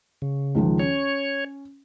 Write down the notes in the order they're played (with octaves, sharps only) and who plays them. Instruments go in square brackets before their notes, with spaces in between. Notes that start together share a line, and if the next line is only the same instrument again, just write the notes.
[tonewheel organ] C#3
[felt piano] C#2 D#3 F3
[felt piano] C#4 [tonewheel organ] C#5